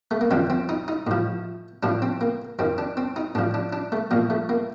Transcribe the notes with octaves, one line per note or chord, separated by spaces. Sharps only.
A3
A#3
F2 D3 F3 C4
C4
D#4
D#4
A2 F3
A2 F3 D4
C4
A#3
F2 D#3 C4
D4
C4
D#4
A2 F3 D4
D4
D4
A3
A#2 F3 A#3
A3
A#3